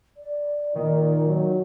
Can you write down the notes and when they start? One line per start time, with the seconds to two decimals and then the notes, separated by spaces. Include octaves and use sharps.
0.17 D5
0.76 A#2 D#3 D#4
1.27 F#3